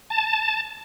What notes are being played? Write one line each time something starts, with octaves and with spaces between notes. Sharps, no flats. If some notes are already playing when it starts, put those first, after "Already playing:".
A5